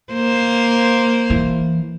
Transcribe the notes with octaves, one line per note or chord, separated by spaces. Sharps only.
A#3 C5
E3